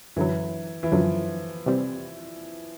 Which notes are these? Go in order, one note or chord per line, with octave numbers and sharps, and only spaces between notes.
F#2 D3 E3 F#3
E3
F#2 D3 F3 F#3
C3 E3 G3 C4